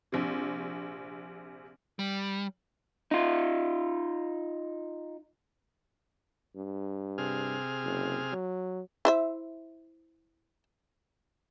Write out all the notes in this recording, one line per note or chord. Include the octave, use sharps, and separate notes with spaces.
A#1 C3
G3
D#4 F4
G2
C3 G#4 F6
F#1
F#3
E4 C5 E5